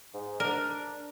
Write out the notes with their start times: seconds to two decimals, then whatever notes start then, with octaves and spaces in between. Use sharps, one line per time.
0.14 G#2
0.40 D4 A#4